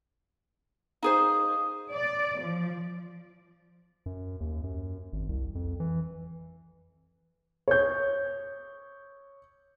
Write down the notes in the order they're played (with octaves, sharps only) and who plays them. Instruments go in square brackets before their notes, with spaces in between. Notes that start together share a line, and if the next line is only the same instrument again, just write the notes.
[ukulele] D#4 G#4 C5 [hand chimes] F5 D#6
[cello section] D5
F3
[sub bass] F#2
D#2
F#2
G#1
C2
F2
E3
[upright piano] C#5 G6